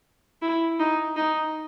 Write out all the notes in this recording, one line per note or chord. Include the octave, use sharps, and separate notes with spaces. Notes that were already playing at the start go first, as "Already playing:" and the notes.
E4
D#4
D#4